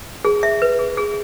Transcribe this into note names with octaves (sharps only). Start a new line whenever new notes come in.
G#4
E5
B4
G#4
G#4